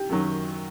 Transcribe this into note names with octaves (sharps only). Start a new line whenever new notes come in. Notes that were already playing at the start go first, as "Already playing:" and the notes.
Already playing: G4
F#2 D#3 F#3